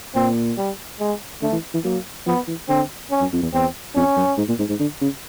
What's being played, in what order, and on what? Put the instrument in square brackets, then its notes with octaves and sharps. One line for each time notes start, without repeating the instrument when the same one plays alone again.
[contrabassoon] A#2 [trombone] C4
[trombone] G3
G#3
[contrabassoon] D3 [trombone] A3
[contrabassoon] E3
E3
[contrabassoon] F#3 [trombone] A#3
[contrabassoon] F3 [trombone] B3
[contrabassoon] E3
[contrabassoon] D3 [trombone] C4
[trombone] C#4
[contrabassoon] F#2
F2
E2
[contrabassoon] E2 [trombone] C4
[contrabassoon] F2 [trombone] C#4
[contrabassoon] F#2
G#2
A#2
G#2
G#2
D3
C#3